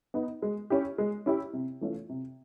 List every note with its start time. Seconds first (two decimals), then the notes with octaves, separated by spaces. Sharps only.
0.14 B3 D#4
0.42 G#3
0.70 C#4 E4 G4
0.98 G#3
1.26 C#4 E4 G4
1.53 C3
1.81 E3 A3 C#4 F4
2.09 C3